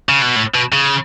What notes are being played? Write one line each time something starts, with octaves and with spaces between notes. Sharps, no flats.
C#3
B2
A2
B2
C#3